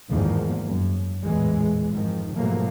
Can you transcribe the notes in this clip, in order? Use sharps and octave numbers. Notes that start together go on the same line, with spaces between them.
G1 E2 G#2 D#3 F3 A#3
F#2
A1 E2 A#2 E3 G#3
F2 G#2 D#3 F3
G#2 B2 F3 F#3 A3 A#3